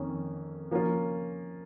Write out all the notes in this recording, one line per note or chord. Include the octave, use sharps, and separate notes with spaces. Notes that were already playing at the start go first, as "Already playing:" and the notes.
Already playing: F2 D#3 A#3 C#4
F3 A#3 C#4 F4